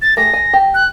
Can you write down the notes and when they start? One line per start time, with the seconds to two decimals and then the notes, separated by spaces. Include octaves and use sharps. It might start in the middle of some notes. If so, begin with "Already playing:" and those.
0.02 A6
0.17 A3 G4 G#4 A#6
0.33 G#5
0.53 G4
0.74 F#6